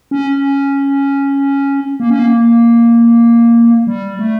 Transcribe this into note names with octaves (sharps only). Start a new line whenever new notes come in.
C#4
A#3
C#4
A#3
G3
A3